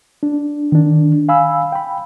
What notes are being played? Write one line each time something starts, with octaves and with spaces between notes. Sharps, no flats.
D4
D#3 D4
F5 G#5 B5 E6
G5 B5